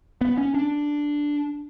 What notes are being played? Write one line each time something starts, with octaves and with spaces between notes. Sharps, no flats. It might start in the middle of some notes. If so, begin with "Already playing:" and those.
B3
C#4
D4